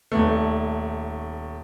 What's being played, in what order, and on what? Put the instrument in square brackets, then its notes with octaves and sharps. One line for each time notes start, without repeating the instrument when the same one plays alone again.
[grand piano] D#1 A3